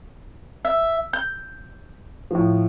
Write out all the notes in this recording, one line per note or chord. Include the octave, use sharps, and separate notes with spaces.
E5
G6
A2 F3